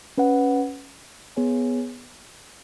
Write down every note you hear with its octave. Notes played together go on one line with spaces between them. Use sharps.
C#4 B4 F#5
B3 G#4 C#5 G#5